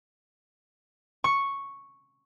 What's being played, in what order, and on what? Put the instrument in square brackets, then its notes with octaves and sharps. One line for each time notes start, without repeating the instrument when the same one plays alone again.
[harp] C#6